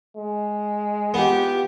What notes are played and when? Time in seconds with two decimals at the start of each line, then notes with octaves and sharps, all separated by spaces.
0.17 G#3
1.14 B3 F4 G4